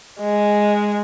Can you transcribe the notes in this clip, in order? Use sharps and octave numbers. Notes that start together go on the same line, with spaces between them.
G#3